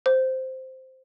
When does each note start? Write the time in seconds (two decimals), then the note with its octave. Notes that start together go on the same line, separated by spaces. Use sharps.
0.06 C5